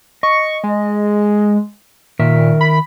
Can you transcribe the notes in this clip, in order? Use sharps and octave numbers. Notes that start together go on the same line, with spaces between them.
D#5 C#6
G#3
A#2 D#3 A#4 E5
B5